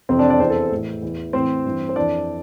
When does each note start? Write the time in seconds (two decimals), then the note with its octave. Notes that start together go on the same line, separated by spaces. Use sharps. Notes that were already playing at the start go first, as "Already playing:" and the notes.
0.09 F2 C3 E3 C4 C5
0.19 D4 D5
0.29 D4 D5
0.39 E2 E3 C4 C5
0.50 A4
0.72 A2 E3
1.02 E2 E3
1.33 A2 E3 C4 C5
1.65 G2 E3
1.89 C5
1.96 F2 E3 D4 D5